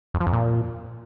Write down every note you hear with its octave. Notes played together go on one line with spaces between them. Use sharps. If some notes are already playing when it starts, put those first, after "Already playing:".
F2
F3
F2
A#2